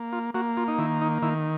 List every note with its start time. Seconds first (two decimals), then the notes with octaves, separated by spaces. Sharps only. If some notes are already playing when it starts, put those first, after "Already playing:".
Already playing: A#3
0.13 F4
0.34 A#3 F#4
0.57 F4
0.68 D#4
0.78 D#3 E4
1.01 D#4
1.22 D#3 E4